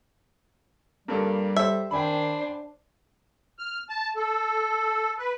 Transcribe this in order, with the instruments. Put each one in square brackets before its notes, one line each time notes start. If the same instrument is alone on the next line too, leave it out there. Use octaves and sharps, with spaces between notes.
[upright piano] G2 A#3 A4 [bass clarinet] G3
[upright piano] G4 A4 C5 [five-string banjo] E5
[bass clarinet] D#3 [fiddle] D4 C5 [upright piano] G5 G#5 B5
[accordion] F6
A5
A4
B4